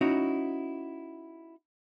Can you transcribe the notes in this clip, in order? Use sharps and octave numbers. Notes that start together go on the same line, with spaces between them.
C#4 D#4 E4 F#4